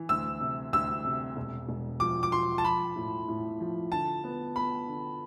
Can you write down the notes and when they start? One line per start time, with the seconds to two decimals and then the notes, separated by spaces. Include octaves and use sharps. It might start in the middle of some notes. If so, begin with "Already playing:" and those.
Already playing: E3
0.09 D2 E6
0.40 C3
0.73 D2 E6
1.04 C3
1.37 E1
1.69 E1
2.00 F3 D6
2.23 D6
2.32 F3 C6
2.58 A5
2.64 F3 B5
2.96 A2
3.28 A2
3.60 F3
3.92 D3 A5
4.24 B3
4.56 B3 B5
4.88 D3